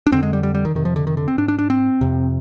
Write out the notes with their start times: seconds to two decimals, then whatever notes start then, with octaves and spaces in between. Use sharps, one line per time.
0.07 D4
0.12 F2 D3 C4
0.23 G#3
0.33 G3
0.43 G3
0.55 G3
0.65 D#3
0.75 F2 C3 D#3
0.85 F3
0.96 D3
1.07 D#3
1.17 D3
1.28 C4
1.38 G#2 D4
1.48 D4
1.59 D4
1.70 C4
2.01 F2 C3